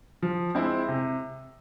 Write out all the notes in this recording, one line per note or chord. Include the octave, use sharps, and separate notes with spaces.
F3
G#3 C4 E4
C3